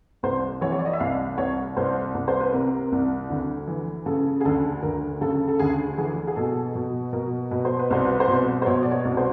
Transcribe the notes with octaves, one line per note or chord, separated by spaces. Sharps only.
C2 C5
E3 C#5
C#5
D5
D#5
E5
C2 F5
C2 C#5
C2 C5
C2
C5
B4
C3 A#4
C2
D2
E3
C#3 A4
G#4
D2 A4
D2 A#4
C#3 A4
A4
D2 G#4
E3 G#4
G#4
B2 A4
B2
B2 A#4
B2 B4
C5
B4
C2 C5
B4
C5
B2
B4
C5
B2 C#5
D5
C#5
C2
C5